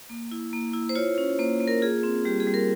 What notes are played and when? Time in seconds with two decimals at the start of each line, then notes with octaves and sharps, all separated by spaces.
0.10 A#3
0.31 E4
0.53 A#3
0.74 E4
0.89 C5
0.95 F4 C#5
1.18 C#4
1.39 A#3 C5
1.60 A#3
1.68 A#4
1.82 F4 G#4
2.03 C4
2.25 G3 G4
2.40 G#4
2.47 G3
2.54 A#4